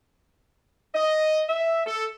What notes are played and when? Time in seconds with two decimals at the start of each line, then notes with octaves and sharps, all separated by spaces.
0.95 D#5
1.48 E5
1.86 A4